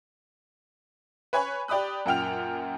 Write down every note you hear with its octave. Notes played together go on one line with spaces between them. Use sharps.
B4 C#5 G#5 B5 C#6
G4 D5 B5 D#6 F#6
F#2 A#2 F#5 G5 F6 F7